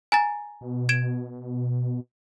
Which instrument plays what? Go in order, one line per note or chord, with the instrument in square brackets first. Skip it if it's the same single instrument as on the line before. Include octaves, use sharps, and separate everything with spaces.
[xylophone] G#5 A#5 A6
[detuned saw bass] B2
[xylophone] G#6 D7 E7